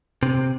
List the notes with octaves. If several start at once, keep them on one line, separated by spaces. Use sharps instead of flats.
C3